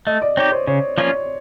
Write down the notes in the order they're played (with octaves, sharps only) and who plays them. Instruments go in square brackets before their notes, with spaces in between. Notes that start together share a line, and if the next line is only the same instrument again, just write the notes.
[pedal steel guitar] A3 [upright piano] D#5
[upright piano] D5
[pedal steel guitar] C4 D#4 G4 [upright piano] C#5
[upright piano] C5
[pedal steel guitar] C#3 [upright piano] C#5
[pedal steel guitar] F3 A#3 C#4 F4 [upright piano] C#5